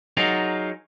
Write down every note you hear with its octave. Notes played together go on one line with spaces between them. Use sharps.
F#3 D#4 F4 G#4 A#4